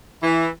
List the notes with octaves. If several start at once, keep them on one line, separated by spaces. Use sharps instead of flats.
E3